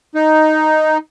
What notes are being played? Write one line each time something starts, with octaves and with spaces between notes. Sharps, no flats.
D#4